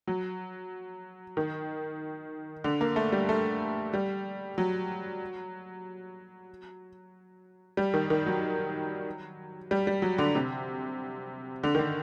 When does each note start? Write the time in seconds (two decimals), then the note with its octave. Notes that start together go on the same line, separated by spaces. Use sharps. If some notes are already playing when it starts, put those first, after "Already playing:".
0.07 F#3
1.37 D#3
2.64 D3
2.81 A#3
2.96 A3
3.12 G3
3.29 A3
3.94 G3
4.58 F#3
7.77 G3
7.94 D#3
8.10 D#3
8.26 F#3
9.71 G3
9.87 G3
10.02 F#3
10.18 D3
10.35 C3
11.63 D3
11.75 D#3
11.79 D3